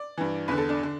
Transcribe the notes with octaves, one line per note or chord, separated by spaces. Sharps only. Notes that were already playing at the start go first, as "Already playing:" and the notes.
Already playing: D5
G2 E3
E2 D3 B4
A4
D4
D3